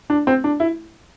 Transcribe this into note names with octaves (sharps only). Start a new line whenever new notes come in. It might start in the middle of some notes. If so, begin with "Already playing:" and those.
D4
C4
D4
E4